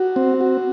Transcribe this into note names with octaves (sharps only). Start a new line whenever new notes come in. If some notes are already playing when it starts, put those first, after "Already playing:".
Already playing: F#4
C4
F#4